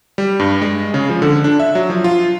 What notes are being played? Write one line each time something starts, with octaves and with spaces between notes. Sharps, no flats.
G3
G2
G#3
C#3
F3
D3
D4
E5
F#3
F3
F4